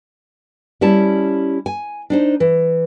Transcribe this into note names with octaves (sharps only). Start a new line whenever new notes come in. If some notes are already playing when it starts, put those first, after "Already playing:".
G3 C#4 E4 A5
G#5
D4 D#4 C5
E3